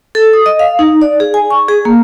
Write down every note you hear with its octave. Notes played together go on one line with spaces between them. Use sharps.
A4
D#6
D#5
F5
D#4
D5
G#4
G#5
C#6
G#4
A#3